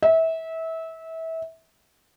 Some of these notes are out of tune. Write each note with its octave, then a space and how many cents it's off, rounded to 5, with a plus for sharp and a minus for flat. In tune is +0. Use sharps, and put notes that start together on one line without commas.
E5 -25